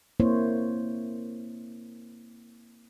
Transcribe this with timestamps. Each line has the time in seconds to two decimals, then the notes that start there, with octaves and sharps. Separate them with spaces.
0.20 A#3 C4 E4 C5 C#5